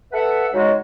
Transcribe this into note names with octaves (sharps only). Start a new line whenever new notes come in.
A4 B4 E5 F#5
C#3 G#3 D#4 F#4